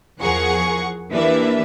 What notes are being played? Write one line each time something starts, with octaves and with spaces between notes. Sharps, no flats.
E2 F3 G#4 A#4 F#5 C#6
E3 A#3 D4 G4 B4 E5